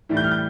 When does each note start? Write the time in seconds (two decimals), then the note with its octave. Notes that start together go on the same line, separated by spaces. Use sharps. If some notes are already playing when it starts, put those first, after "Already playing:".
0.09 A2 E3 G3
0.17 G6
0.24 F6
0.31 G6